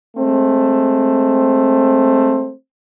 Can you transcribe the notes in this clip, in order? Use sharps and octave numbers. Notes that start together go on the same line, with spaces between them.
G#3 A3 C4